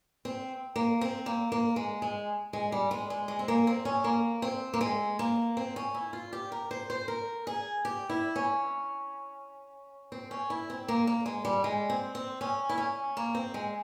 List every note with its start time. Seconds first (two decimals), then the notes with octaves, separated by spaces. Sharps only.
0.25 C4
0.76 A#3
1.01 C4
1.26 A#3
1.52 A#3
1.76 G#3
2.02 G#3
2.53 G#3
2.72 G3
2.91 G#3
3.10 G#3
3.28 G#3
3.39 C4
3.48 A#3
3.67 C4
3.85 C#4
4.04 A#3
4.42 C4
4.74 A#3
4.81 G#3
5.19 A#3
5.57 C4
5.76 C#4
5.94 E4
6.13 F4
6.33 G4
6.52 A#4
6.71 C5
6.90 C5
7.08 A#4
7.47 G#4
7.85 G4
8.10 E4
8.36 C#4
10.12 C4
10.31 C#4
10.50 E4
10.70 C4
10.88 A#3
11.07 A#3
11.26 G#3
11.45 G3
11.64 G#3
11.90 C4
12.15 C4
12.41 C#4
12.69 E4
12.78 C#4
13.17 A#3
13.35 C4
13.54 G#3